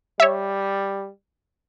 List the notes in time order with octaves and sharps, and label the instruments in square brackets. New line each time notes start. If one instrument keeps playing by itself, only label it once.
[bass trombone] G3 [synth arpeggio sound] C#5 E5